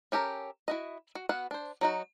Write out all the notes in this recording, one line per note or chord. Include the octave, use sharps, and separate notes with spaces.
C#4 G4 A4 A#4
E4 F#4 D#5
F#4
B3 F#4 F5 F#5
D4 C5
F#3 D#4 F#4